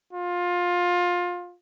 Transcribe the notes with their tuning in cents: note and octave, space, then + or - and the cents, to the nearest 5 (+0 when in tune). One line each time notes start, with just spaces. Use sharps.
F4 +20